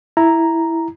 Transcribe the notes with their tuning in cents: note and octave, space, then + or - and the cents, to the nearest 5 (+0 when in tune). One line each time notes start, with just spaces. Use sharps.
E4 +0 A#5 +0